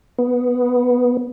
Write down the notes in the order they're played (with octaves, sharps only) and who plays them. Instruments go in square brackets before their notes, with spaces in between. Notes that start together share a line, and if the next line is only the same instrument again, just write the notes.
[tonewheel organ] B3